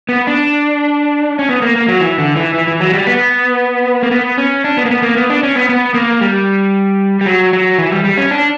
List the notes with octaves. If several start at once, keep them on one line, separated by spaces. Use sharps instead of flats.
B3
D4
C#4
B3
A#3
A#3
F#3
E3
D3
E3
E3
E3
F#3
G3
B3
A#3
B3
C#4
D4
B3
A#3
B3
A#3
B3
D4
C#4
B3
B3
A#3
G3
G3
F#3
F#3
E3
G3
G3
C#4
D4